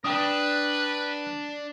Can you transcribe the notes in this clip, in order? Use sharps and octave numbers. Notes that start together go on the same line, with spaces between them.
D4 B4 G5 D#6